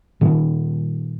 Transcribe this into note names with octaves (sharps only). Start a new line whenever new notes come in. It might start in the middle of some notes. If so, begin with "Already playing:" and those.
A#2 D#3 G3